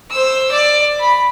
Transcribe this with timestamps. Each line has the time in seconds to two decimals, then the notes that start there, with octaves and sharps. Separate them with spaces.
0.11 C5 E6
0.52 D5
1.00 B5